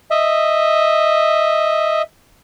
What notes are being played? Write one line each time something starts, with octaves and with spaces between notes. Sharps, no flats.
D#5 E5